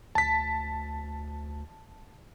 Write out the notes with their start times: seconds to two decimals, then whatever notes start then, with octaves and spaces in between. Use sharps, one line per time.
0.15 D2 A5 B6